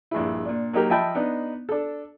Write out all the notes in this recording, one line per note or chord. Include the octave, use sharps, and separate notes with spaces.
A#1 G2 G#3 E4
A#2 D4
F#3 A#3 D#4 G4 A#4
F3 D#5 E5 G5 A5 B5
B3 D4 D#4
D4 A4